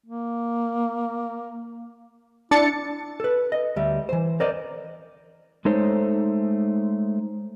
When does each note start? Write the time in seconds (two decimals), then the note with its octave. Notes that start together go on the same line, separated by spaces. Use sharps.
0.06 A#3
2.51 D4 E4 A6 C#7
3.20 A4 B4
3.52 D#5
3.76 D2 G3 E5
4.09 E3 C5
4.40 A#4 C5 D5 D#5
5.65 G#3 A3 D#4 A4 C5 C#5